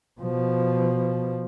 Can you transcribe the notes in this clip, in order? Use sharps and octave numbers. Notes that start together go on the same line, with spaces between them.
B2 F3